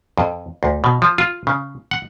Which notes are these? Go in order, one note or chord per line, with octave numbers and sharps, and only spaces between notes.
F2
D2
B2
F3
F4
C#3
F#5